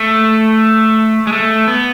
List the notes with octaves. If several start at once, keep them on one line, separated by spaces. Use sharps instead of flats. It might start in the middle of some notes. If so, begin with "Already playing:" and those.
Already playing: A3
G#3
A3
B3